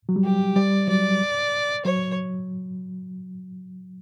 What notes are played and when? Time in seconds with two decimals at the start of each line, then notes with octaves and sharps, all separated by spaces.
0.09 F#3
0.16 G3
0.24 G4
0.56 G3 D5
0.88 F#3 D5
1.85 F#3 C#5